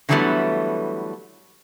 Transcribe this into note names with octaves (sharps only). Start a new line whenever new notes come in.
D3 E3 F#3 G3 A3 B3